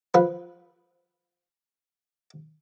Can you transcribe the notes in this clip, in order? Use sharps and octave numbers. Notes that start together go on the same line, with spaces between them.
F3 B4